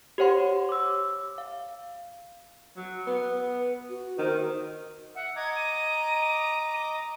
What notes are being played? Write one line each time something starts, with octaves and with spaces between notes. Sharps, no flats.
G4 C5 C#5 F#5 C6
D6 E6
F5
F#3
B3 B4
F#4
D#3 C5
E5 F#5
D#5 A#5 D6 G#6
D#7